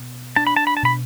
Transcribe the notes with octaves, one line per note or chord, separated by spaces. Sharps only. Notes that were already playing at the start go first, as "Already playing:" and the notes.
Already playing: B2
D4 A5
B5
A5
B5
A5
B2 B5